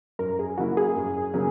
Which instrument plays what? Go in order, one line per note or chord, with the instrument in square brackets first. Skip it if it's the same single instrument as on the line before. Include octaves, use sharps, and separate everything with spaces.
[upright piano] F#2 [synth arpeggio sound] A#4
[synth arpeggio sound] G#4
[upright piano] C#3 F#3 A#3 E4 [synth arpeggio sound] F#4
[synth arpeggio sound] G#4
[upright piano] F#2
C#3 F#3 A#3